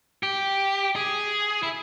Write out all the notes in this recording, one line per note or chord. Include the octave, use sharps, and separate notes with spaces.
G4
G#4
E4